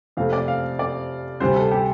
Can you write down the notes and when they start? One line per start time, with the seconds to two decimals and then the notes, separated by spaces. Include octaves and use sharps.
0.17 F2 C3 A3 F5
0.33 D5
0.48 F5
0.79 D5
1.40 D2 C3 G3 C4 C5
1.56 A4
1.71 G4